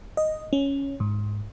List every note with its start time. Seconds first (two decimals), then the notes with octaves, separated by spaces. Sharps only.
0.17 D#5
0.53 C#4
1.00 G#2